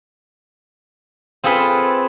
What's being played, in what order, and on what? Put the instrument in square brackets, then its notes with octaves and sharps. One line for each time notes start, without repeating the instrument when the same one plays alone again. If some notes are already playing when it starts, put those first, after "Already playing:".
[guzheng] C4 F4 G#4 A4 B4